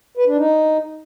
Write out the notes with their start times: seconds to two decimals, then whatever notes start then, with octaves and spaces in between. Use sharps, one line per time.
0.17 B4
0.27 D4
0.37 D#4